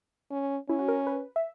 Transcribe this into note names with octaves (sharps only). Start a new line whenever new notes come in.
C#4
C#4 E4
F#4
A#4
B4
E5